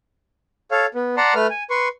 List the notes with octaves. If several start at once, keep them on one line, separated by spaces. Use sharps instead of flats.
A4 C#5 F5
B3
D5 F#5 A5 A#5 C6
A3 B4 F6
G#5
B4 C6 C#6